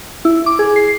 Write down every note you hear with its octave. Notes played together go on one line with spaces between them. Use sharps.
E4
D6
G#4
C7